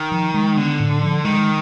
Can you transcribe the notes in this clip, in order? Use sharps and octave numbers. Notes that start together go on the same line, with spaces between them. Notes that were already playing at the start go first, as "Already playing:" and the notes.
Already playing: D#3
F3
G#3
D3 B3
A2
F3
D#3 G#3